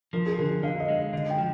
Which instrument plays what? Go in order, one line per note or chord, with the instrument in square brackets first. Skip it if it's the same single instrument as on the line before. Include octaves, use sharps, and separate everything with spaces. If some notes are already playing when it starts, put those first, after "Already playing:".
[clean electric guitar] F3 [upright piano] A#4
[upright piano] G#4
[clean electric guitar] D3 [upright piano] A#4
[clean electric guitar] D3 [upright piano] F5
[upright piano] D#5
[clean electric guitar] G#3
[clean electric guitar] D3 [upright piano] D#5
[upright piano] G5
[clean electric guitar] F3